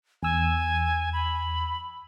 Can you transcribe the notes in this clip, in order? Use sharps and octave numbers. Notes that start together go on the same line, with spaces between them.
E2 G#5 E6
B5